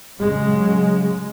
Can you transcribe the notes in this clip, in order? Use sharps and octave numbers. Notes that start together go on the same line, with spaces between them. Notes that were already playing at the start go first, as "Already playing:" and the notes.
C#3 F#3 G#3